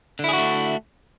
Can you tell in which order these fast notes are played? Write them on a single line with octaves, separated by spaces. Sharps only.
D3 E4 G#4 F#4 A3